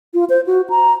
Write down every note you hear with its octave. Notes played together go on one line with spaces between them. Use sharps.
F4
C5
F#4
A#5